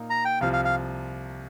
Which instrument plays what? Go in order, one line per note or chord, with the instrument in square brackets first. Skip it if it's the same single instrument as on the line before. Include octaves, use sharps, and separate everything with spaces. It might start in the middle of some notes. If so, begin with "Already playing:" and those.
Already playing: [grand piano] A#2 A#3 D#4
[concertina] A#5
G5
[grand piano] C2 C3 F3 [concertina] F5
[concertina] F5
F5